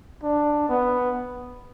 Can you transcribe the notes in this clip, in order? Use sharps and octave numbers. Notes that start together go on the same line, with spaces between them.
D4
B3